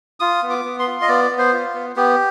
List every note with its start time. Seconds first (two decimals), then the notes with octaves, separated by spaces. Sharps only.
0.20 F4 D#6
0.43 B3
0.50 D6
0.65 B3
0.79 C6
0.87 F4
1.02 D#5
1.08 B3 D5
1.31 B3
1.38 C5
1.53 F4
1.74 B3
1.96 B3 G4